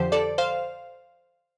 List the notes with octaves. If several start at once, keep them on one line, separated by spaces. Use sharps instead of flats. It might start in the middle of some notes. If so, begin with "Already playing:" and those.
Already playing: F2 D3 F3 G4 C5
A4 D5
C5 F5